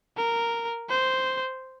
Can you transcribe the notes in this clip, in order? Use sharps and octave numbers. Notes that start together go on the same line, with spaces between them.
A#4
C5